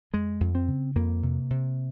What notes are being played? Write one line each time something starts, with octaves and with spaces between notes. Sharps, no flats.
F2 G#3
F2
C4
C#3
F2 A#3
C3
C3